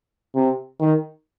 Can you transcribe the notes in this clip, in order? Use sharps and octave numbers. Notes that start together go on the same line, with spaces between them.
C3
D#3